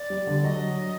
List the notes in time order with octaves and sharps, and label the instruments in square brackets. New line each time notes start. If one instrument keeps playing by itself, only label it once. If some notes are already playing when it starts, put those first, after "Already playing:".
Already playing: [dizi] D5
[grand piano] G3
D3
[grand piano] F#3 [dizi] D#5